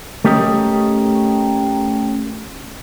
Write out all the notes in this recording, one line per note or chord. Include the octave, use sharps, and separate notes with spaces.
A3 C#4 G4 A#4 D#5